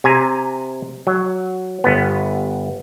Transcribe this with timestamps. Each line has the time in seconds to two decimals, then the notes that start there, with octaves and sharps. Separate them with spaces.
0.04 C3 G#5 A#5
1.07 F#3
1.84 G1 B3